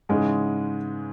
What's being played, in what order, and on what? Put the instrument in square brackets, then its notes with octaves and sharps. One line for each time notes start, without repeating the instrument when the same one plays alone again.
[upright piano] G#2 G#3 [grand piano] C#3 E3 C#4